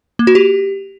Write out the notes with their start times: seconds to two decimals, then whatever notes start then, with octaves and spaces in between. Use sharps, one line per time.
0.19 A#3
0.27 F#4
0.35 G4